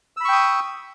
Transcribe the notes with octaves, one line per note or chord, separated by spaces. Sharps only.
G5 B5 C#6 D#6 E6